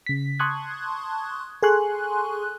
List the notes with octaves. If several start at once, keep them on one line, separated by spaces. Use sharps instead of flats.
C#3 B6
A5 C6 C#6 D#6 F#6 G#6
G#4 A4 G#5 C6 C#6 F#6